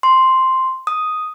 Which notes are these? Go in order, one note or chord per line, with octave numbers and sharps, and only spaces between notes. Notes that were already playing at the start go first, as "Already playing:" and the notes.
C6
D#6